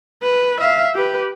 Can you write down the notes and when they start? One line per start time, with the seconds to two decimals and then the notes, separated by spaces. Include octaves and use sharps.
0.22 B4
0.60 E5 F5
0.94 G4 B4